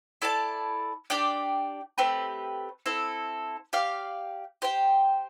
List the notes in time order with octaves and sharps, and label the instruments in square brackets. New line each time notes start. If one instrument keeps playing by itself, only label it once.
[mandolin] E4 A4 D5 A5
D4 G4 D5 G5
A3 C4 G4 B4
C4 E4 A4
G4 D5 F5
G4 C5 G5